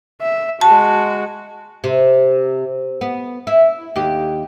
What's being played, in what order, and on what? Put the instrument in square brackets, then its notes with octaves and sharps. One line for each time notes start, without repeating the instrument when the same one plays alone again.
[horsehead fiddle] E5
[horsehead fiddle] G#3 F#4 [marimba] A5
[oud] C3
B3
E4
D#2 G4